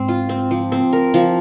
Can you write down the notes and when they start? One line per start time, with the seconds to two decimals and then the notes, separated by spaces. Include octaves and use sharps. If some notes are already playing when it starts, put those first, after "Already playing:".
Already playing: G#2 C4
0.08 F4
0.29 C4
0.51 F3
0.72 C4
0.93 A#4
1.14 F3